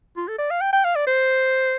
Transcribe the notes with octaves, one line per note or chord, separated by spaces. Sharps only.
F4
A4
D5
F5
G5
G5
F5
D5
C5